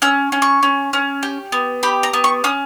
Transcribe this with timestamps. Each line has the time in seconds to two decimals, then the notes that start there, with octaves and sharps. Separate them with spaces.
0.02 C#4 E6
0.32 C#4
0.42 C#6
0.63 C#4
0.93 C#4
1.23 G4
1.52 B3
1.83 G4 B5
2.03 A#5
2.13 B3
2.24 C#6
2.44 C#4 D#6